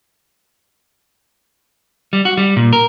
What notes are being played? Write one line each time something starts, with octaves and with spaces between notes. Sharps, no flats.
G3
F#4
G3
A#2
A#4